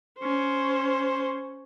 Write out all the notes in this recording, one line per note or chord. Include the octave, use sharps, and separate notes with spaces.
C#4 C5